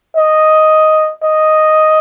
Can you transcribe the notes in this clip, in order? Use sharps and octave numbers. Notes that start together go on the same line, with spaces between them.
D#5
D#5